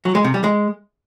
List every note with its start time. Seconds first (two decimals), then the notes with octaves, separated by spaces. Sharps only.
0.05 F#3
0.15 G#3
0.24 C3
0.34 G3
0.44 G#3